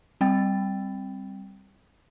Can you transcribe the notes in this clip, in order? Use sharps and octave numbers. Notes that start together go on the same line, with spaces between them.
G3 C4 G5 A6